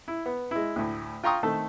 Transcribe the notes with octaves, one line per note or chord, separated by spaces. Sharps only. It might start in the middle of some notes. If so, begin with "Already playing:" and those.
E4
B3
G#3 E4
D2 A2
F4 G5 A#5 C6 C#6 D#6
D#3 A3 C4 A4